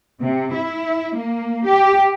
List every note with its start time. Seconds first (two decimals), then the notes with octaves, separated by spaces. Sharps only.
0.22 C3
0.54 E4
1.14 A#3
1.65 G4